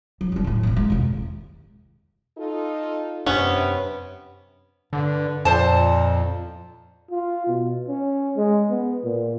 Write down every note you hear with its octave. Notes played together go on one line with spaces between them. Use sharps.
F#3
G3 D4
F#2 A2
G#1 A#3
G#3
E1 D#2
D#4 F4 A4
F#2 C3 B3 C#4 D4
G2 D3
F2 A#2 C5 A5
F4
B2
C#4
G#3
B3
A#2